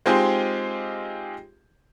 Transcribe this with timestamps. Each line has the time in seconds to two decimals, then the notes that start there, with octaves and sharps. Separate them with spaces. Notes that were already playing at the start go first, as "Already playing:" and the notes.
0.06 G#3 C4 D#4 F4 G4 G#4